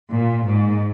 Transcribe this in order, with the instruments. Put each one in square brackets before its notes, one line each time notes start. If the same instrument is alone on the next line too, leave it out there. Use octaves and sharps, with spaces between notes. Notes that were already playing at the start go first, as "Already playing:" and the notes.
[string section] A#2
G#2